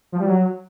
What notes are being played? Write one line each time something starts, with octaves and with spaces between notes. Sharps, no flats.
F3
G3
F#3